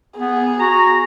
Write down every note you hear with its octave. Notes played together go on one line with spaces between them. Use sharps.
B3 G#4
F#4 A#5